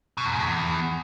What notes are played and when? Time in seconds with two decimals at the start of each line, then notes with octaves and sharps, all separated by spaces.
0.18 B2
0.25 E2
0.32 G#2
0.39 A2
0.46 E2